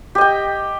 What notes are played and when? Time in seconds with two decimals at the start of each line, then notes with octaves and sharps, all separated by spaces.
0.15 G4
0.18 D#5
0.21 G5